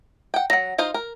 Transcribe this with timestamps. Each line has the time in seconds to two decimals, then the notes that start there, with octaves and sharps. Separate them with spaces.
0.34 F#5 G5
0.50 F#3 F#5 A#6
0.78 D#4 F4 C5
0.94 A#4